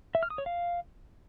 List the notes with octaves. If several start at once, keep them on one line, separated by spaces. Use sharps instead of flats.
E5
F6
D#6
C#5
F5